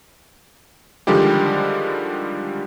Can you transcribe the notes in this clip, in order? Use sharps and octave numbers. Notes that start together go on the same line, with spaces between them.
D3 D#3 F3 G3 G#3 G4